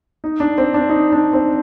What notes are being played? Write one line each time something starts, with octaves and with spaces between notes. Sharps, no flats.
D#4
D4
C4
D4
D#4
D4
C4